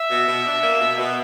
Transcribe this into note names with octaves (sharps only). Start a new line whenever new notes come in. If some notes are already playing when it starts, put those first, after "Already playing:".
Already playing: E5
B2
B2
D4
A#3
B2
B2